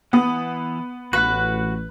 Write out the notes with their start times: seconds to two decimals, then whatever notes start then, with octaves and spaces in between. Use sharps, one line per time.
0.13 E3 B3 F#5 D#6
1.13 A1 F#4 B4 F#5 F#6